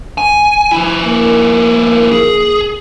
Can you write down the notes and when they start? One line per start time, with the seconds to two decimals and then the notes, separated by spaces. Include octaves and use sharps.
0.18 G#5
0.72 F3 E4
1.04 A#3
2.11 G#4